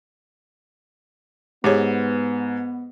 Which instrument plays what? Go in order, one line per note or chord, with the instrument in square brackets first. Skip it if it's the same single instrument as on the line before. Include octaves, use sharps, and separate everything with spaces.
[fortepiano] G#2 [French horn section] B3 [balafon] G4 G#4 C#5